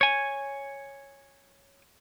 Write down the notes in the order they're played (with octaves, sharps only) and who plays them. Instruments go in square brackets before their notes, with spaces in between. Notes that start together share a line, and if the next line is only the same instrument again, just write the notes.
[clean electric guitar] C#5 G#5